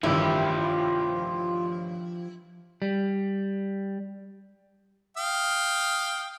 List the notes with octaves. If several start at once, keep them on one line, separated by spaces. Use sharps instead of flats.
A1 G2 D#3 F3 E4 F4 G4
G3
F5 G5 D#6